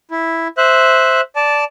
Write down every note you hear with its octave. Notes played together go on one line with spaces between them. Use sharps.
E4
C5 E5 F#6
D5 A5